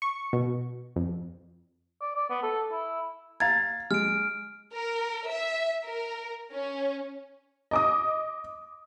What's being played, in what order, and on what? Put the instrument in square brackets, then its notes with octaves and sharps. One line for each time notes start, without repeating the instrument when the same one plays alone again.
[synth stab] C#6
B2
F2
[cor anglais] D5
D5
B3
A4
E4
[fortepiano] F5 A#5 [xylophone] G#6 A6
[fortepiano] G#3 [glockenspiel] F6 D7
[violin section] A#4
E5
A#4
C#4
[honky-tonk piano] D#5 D6 D#6